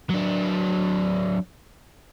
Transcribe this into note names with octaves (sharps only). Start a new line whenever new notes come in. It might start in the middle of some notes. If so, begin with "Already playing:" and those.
F#3 D4